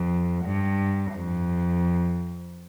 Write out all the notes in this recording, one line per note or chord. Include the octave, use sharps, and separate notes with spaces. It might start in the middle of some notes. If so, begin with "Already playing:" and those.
Already playing: F2
G2
F2